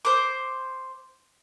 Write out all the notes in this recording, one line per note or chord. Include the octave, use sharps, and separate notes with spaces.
C5 D6